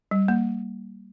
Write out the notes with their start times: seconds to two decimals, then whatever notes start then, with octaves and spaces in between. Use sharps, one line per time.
0.11 G3
0.28 A#3